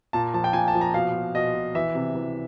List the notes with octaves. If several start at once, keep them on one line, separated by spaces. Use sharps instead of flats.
A#2 A5
F3 A5
G5
A#2 G#5
A5
F3
A#5
B2 F5
B2
B2 D#5
B2
E3 E5
C3
E3